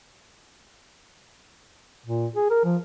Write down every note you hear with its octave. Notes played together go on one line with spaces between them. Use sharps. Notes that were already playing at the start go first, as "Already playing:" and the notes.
A#2
G#4
A#4
F3